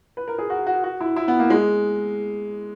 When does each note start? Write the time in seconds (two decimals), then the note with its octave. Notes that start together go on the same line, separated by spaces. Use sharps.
0.17 B4
0.28 A#4
0.38 G#4
0.50 F#4
0.67 F#4
0.84 F#4
1.01 E4
1.16 E4
1.28 B3
1.39 A#3
1.50 G#3